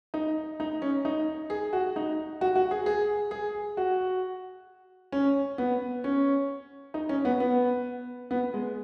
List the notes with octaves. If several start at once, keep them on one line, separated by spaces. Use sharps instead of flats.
D#4
D#4
C#4
D#4
G#4
F#4
D#4
F#4
F#4
G#4
G#4
G#4
F#4
C#4
B3
C#4
D#4
C#4
B3
B3
B3
G#3